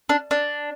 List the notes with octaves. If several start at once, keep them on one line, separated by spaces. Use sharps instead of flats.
D4
D4